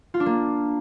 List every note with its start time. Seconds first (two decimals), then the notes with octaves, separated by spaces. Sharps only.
0.14 F4
0.20 D4
0.26 A#3